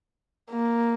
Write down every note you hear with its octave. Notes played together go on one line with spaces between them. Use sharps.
A#3